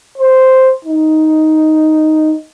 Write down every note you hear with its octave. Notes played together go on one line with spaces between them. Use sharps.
C5
D#4